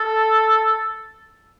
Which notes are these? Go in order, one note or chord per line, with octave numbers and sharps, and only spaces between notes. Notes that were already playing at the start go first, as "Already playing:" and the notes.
Already playing: A4